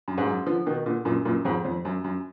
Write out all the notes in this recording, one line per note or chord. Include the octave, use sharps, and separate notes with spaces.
F#2
G#2
F#2
D3 F3
B2 D#3
A#2 D3
F#2 A#2
F#2 A#2
F2 G#2
F2
F#2
F#2